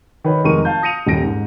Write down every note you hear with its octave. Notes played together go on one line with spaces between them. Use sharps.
D#3 B4 C#5
F1 D#3 G#3 A#4 C#6 D#7
F5 A5 G6
D#6 A#6 C#7 D#7 F7
D#1 D#2 G3 A#6 D7
G#2